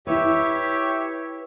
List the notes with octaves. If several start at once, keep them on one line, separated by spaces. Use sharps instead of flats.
E4 G4 B4 C#5 E5